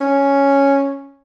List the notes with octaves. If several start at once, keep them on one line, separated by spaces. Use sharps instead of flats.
C#4